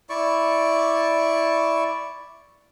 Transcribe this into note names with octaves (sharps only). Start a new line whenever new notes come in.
E4 D5 C#6